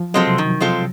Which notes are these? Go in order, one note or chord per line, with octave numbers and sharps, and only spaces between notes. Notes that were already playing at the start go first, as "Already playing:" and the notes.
Already playing: F3
F#3 G#3 C4 F4 A4
C3
D#3
G#3 C4 F4 A4